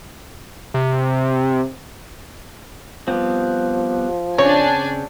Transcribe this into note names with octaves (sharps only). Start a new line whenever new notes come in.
C3
F3 G3 B3 C4
C#3 C4 D4 C#5 G#5